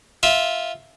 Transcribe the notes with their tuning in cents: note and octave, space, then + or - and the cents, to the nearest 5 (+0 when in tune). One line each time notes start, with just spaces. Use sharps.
F4 +0 E5 -15